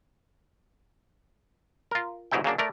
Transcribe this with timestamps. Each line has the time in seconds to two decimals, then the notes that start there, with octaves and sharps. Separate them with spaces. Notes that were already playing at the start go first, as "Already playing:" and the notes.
1.91 F4 A#4
2.31 G1 G#2 F#3 D#4 E4 G5
2.44 C#3 F#3 A#3 D4
2.58 A3 A#4 D5